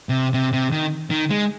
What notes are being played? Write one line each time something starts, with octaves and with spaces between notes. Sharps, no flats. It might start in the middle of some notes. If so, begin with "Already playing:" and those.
C3
C3
C3
D#3
D#3
G#3